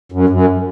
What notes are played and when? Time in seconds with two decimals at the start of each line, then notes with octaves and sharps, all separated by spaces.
0.12 F#2
0.30 F#2